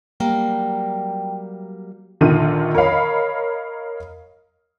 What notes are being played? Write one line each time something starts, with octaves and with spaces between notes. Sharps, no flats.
F#3 G3 A#3 G5
A#1 D3 D#3 F4 D#7
A#4 C#5 D#5 F5 B5